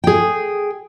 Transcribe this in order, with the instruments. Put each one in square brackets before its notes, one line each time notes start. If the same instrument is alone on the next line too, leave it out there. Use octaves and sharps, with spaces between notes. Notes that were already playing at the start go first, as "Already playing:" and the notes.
[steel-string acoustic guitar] G#4 G5